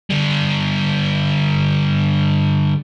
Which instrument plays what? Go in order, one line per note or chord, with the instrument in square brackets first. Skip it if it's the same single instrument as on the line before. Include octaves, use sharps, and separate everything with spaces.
[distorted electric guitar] D3 G3